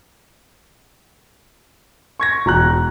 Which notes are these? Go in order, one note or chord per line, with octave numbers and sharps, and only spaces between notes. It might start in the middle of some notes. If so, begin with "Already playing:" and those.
C#6 G#6 A#6
E1 A#5 F#6